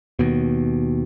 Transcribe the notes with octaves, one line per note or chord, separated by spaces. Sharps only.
D#2 B2